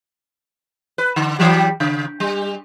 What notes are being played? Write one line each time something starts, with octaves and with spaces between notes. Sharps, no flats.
B4
D3
E3 F#3 G3
C#3
G3